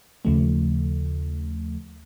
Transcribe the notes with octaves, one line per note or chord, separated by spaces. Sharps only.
D#2 C#3 F3 A3